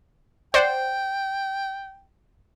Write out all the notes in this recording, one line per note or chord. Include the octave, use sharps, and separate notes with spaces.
C5 D5 F#5 G5